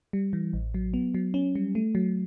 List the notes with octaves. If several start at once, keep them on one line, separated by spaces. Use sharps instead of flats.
G3
E3
A1
F#3
B3
F#3
C#4
G3
A3
F#3